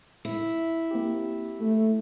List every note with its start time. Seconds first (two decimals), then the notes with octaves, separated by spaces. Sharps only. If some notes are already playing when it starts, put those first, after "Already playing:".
0.25 E4
0.91 A#3 C4 G4
1.60 A3